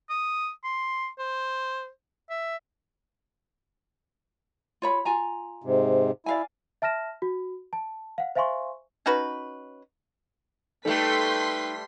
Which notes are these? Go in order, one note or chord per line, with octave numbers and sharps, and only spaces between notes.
D#6
C6
C5
E5
F4 C#5 B5
F4 G#5 A#5
G#2 C3
E4 D5 F5 G#5
E5 A5 F6 A#6 E7
F#4
A5
F5 F#5
C5 E5 F5 G#5 C6 C#6
C#4 D#4 F#4 B4
G3 A3 D#4 A4 B4 G5 C6 B6